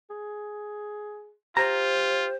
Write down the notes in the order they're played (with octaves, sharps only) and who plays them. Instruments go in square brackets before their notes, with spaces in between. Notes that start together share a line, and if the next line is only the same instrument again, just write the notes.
[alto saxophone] G#4
[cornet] F4 [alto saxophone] G4 [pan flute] C5 [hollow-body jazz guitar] A#5